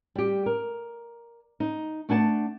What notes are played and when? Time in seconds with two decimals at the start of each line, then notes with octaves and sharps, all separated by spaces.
0.15 G3 G4
0.46 A#4
1.60 D#4
2.09 A3 D4 F#5 G#5 A5